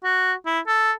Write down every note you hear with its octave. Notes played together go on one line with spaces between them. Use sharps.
F#4
E4
A4